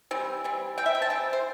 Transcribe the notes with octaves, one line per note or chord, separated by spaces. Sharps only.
E3 G3 C4
E3 G3 C4
E3 G3 C4 G5
E5
G5
A5
E3 G3 C4 G5
C5